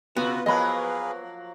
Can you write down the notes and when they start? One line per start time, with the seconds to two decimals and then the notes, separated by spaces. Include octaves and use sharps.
0.16 C3 B3 F4 F#4 B4
0.46 F3 F#3 A#3 G#4 B4 D#5 F5 B5